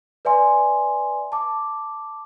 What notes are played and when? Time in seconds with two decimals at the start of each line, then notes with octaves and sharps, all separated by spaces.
0.25 B4 D5 E5 G#5 C6
1.32 A5 D6